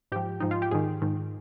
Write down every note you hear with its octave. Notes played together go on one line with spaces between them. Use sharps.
G#2 F3 G4
G#2 F3 D#4
F4
G4
G#2 D#3 G#4
G#2 D#3